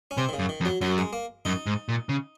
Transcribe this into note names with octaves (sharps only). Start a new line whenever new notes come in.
C#4
C3 C4
D#3
C#3
F#2
D#3
F2
F#3
F#2 F#3
G#3
A#3
F#2 D#4
G#2
A#2
C#3